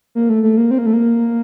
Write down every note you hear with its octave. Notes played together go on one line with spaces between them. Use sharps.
A#3
A3
A3
A#3
C4
A#3
A3
A#3